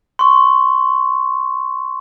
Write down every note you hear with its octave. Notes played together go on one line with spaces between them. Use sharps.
C6 C#6